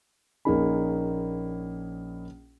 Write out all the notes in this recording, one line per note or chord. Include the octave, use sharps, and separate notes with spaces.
A#1 A#3 C#4 D#4 G#4 B5